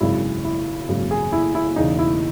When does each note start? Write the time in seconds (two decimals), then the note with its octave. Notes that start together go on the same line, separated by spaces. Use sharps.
0.01 G#1 F#2 C#3 E4
0.45 E4
0.89 G#1 F#2 C#3
1.11 G#4
1.32 E4
1.55 E4
1.76 E1 E2 C#3 D#4
1.99 E4